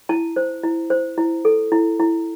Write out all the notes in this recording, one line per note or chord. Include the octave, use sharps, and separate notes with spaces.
E4 A5
C5
E4
C5
E4
A4
E4
E4